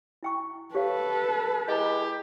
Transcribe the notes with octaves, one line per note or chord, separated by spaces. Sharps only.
E4 G5 C#6
G4 A4 B4 C#5 F5
G#3 E4 G4 D#5 A#5